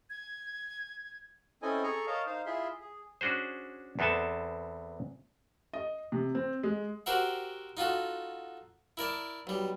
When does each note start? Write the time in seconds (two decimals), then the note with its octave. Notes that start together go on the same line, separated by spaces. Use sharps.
0.10 G#6
1.62 C4 C#4 E4 A4 D#5 G#5
1.83 G#4 A4 G#5 A#5 C#6
2.07 A#4 C#5 D#5 F5 A5 A#5
2.26 D#4 C5 F5
2.46 E4 F4 G#4 E5 C6
2.80 G#4
3.21 C#4 D4 F#4 G#4 C5
3.99 E2 B3 C4 A4 G#5 A5
5.73 D#5
6.12 C3
6.35 C4
6.63 G#3
7.06 F#4 G4 A#4 C5 E5 F#5
7.77 D#4 F4 F#4 A4
8.97 E4 A#4 D5 A5
9.47 B1 G3